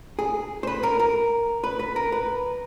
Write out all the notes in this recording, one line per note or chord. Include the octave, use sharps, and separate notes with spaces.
G#4
C5
B4
A#4
A#4
B4
B4
A#4
B4